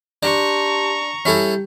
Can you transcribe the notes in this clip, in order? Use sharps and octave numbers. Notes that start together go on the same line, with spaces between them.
D4 G4 A5 A#5 C6 C#6
G3 C#4 E4 G4 A4